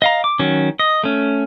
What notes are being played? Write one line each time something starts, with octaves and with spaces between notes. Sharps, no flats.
D#5 F5 A#5
D6
D#3 F#3 C#4
D#5
A3 C#4